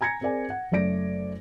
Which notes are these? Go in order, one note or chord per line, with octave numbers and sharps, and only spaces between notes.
G#5 A#5 G#6 A#6 C#7
C4 G#4 A#4 D5 G#5
F#5
F#1 F#2 A3 D5 A#6 D7